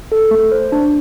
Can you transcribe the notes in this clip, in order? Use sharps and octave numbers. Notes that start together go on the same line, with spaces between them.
A4
A3
C5
D4